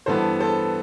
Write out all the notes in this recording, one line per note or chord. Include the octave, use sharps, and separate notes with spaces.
G2 E3 B3 A4 C5
A4 C5